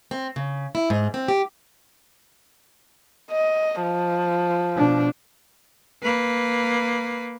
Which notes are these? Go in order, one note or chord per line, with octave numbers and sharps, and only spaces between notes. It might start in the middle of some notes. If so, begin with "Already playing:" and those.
C4
C#3
E4
G#2
C4
G4
D#5
F3
B2 D4
A#3 B4